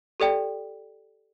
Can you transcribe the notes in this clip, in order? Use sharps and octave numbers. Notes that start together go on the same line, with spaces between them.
G4 A4 D5 G5